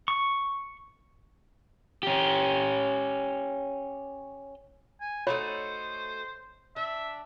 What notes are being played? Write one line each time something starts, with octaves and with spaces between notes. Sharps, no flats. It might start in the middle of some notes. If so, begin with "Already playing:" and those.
C#6
C#4 G4
G#5
A3 D#4 F#4 C5 C#5 B5
D4 E5